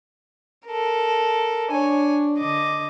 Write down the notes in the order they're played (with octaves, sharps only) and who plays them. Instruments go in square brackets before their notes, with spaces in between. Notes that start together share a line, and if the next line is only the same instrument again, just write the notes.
[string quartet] A4 A#4
[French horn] D4 [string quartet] C#5 G#5
[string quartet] D3 D#5 D6